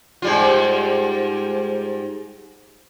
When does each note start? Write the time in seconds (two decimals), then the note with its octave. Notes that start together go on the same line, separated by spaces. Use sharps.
0.22 G#2 G3 F4